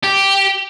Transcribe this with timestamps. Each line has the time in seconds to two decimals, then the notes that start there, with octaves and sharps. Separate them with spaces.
0.04 G4